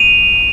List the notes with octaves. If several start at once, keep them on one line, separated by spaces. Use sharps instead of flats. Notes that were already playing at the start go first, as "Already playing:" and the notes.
Already playing: D#7 F7